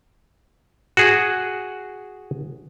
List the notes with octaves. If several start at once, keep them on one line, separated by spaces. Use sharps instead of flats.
F#4 G#4